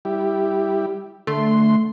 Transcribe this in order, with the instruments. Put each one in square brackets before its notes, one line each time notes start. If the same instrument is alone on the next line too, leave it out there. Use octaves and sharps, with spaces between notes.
[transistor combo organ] G3 E4 G4
[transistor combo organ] D3 C6 [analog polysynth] A3